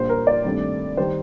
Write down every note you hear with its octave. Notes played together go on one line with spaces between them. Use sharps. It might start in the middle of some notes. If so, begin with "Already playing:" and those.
Already playing: A#1 A#2 G3 A#3 C5
A#4
D5
G2 D#3 A3 C4
D#3 G3 C5